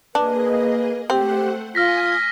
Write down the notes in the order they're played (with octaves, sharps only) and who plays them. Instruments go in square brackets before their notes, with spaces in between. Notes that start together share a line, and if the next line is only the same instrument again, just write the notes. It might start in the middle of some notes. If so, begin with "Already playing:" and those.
[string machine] A#3 G#4 D#5 [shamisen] D4 [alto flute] B4
[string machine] A3 C5 F#5 [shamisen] C4 [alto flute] G4
[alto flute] F4 [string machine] G#5 D#6 [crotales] F6 A#6 B6